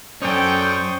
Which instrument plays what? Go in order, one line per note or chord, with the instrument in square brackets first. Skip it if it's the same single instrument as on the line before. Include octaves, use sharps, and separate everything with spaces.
[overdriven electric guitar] F#2 C#4 [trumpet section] A4 D5 G5 [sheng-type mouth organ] C5 C#6 D#6